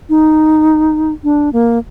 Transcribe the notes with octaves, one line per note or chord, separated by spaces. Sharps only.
D#4
D4
A#3